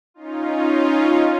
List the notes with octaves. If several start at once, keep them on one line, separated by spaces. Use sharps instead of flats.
C#4 D#4 F4